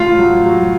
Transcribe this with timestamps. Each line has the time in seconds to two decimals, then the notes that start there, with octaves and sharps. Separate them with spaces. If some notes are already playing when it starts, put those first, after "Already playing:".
Already playing: A2 F4
0.19 F#3
0.45 F#3